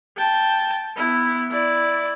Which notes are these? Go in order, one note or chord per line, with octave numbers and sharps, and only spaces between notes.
G5 A5
B3 E4
E4 D5